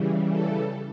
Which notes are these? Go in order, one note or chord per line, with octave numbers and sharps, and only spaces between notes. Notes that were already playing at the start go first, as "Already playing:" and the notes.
Already playing: C#3 E3 G3
A4